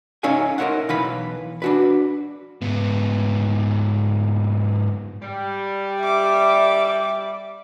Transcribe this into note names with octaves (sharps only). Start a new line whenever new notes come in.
C#4 D#4 C#5 E5 F5 G#5
D#4 A#4 C5 C#5 E5 F#5
B1 E3 B4 F5 B5
D4 F#4 B4
G#2 B3
G3
E5 D6